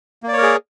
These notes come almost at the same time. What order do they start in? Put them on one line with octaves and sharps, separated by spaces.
A#3 D5 C#5 A#4 G#4